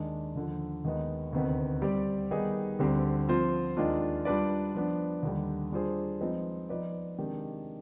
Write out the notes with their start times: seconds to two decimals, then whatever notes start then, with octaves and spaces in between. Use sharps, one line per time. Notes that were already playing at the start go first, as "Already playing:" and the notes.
Already playing: D#2 D#3 G#3 D4
0.36 D#2 D3 F3
0.85 D#2 D#3 G#3 B3 D#4
1.33 D2 C3 D#3 B3
1.82 G3 C4 G4 D5
2.31 D#3 G3 B3 D#4 G#4
2.79 D2 D3 G3 C4 G4
3.28 F3 C4 F4 C5
3.77 D#2 D#3 G#3 D4 F4
4.25 G3 D4 F4 B4 D5
4.74 F3 B3 D4
5.23 D#2 D3 G3
5.72 G3 D4 F4 G#4 C5
6.21 F3 G#3 C4 D#4 B4
6.69 F3 B3 D#4 B4 D5
7.18 C3 D#3 G#3 D4 G4